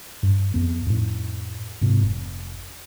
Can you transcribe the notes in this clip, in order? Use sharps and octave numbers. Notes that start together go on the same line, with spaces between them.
G2
F2 B3
F2 A2
G#2 C3
F1